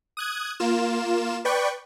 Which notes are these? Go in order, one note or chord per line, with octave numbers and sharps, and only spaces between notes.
D#6 F#6 G#6
A#3 F4 E7
B4 D5 G5 C#6